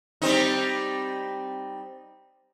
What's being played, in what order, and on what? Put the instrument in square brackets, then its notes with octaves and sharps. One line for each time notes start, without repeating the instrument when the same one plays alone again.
[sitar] G3 C4 D#4